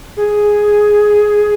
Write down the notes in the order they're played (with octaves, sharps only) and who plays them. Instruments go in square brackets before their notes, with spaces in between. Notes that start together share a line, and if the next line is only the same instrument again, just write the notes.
[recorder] G#4